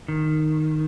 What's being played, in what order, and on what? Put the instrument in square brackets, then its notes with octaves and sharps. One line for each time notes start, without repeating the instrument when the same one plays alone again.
[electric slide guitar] D#3